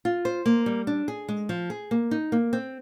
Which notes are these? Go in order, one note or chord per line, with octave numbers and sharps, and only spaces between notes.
F4
C5
A#3
G3
D4
G#4
G#3
F3
G#4
A#3
D#4
A#3
C4